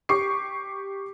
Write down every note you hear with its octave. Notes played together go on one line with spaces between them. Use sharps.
G4 C#6 D6 C7